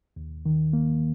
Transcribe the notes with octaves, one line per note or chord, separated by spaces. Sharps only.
D#2
D#3
A#3